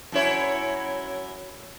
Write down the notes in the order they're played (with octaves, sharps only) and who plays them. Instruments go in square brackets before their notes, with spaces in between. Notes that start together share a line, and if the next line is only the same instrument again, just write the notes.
[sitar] F#2 E4 C#5